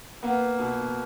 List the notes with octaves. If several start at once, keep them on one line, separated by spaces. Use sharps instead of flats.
A#3 B3
B2